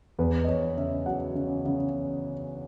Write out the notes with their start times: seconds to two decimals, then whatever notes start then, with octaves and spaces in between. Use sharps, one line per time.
0.19 E2 B4
0.44 D#5
0.48 E2 C#5
0.77 C#3 E5
1.06 F#3 F#5
1.35 C#3
1.65 C#3